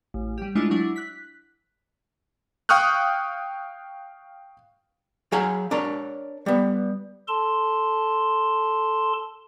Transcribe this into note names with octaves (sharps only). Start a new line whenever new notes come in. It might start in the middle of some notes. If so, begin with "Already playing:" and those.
A1
G3 G4
G#3 A3 D4 E4 F4
F#3 D4 E4
F#6 B6
F5 G5 C#6 D#6 F6 F#6
F#3 G#4 F5 F#5 G#5 A#5
D4 A#4 C#5
G3 B3
A4 A5 C6